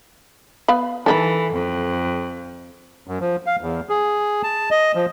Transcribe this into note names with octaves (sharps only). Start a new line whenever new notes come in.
B3 F5 B5
D#3 E3 D4 A4 B5
F2
F#2
F3
F5
E2
G#4
A5
D#5
F3